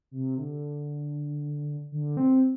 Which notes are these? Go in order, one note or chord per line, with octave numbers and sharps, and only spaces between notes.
C3
D3
D3
C4